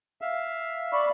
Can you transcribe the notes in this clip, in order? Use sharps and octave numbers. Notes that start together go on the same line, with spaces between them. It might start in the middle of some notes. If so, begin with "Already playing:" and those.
E5 F5
D5 B5 C#6